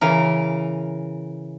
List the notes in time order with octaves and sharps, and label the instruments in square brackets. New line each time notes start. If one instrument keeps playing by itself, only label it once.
[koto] C#3 E3 A#4